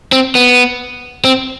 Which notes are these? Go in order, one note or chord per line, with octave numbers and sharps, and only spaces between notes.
C4
B3
C4